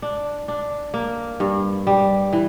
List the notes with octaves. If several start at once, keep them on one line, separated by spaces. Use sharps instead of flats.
D4
D4
A#3
G2
G3
E3